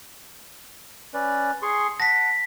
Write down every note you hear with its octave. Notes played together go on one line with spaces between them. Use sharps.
C#4 B4 D5
G#4 C6 C#6
F#5 A5 A#6 B6